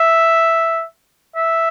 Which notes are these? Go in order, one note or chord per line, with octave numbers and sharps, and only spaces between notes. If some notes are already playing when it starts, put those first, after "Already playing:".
Already playing: E5
E5